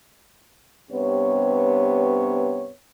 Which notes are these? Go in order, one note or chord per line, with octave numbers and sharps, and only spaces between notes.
G2 C3 B3 C#5